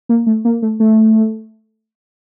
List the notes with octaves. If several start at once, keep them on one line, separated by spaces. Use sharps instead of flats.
A#3
A3
A#3
A3
A3